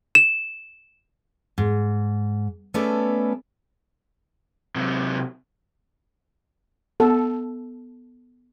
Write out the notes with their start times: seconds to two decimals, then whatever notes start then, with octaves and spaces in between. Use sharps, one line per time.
0.15 E7
1.58 G#2
2.74 A3 B3 C#4 A4 B4 D5
4.76 C3 F#3
7.00 B3 A4